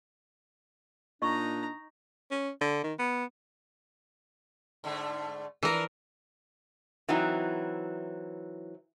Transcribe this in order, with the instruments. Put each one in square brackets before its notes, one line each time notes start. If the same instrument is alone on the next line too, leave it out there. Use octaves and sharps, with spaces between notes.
[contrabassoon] A#2 [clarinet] D4 [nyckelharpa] D#4 A#5 [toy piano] D#5 C#6
[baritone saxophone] C#4
D3
D#3
B3
[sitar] G#2 D3 A3
[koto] E3 A#4 [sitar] F3 D4
[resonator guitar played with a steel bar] E3 F#3 C4 D#4 E4